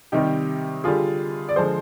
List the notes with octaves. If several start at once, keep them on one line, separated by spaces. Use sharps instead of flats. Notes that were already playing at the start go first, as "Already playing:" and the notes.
C3 D#3 G3 D#4 G4
D3 G3 F4 G#4
D5
D3 F3 G#3 G#4 C5